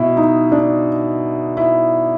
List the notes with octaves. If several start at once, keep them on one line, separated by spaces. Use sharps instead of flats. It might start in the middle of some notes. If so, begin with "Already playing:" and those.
Already playing: B2 E4
D#4
D4
E4